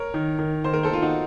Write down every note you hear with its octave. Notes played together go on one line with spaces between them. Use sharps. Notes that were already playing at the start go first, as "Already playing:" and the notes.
Already playing: A#4 C#5
D#3
D#3
D#3 C5
A#4
A4 C5
D#3 F4
D#4 F#4